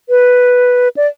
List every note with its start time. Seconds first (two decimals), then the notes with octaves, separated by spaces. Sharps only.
0.09 B4
0.97 D5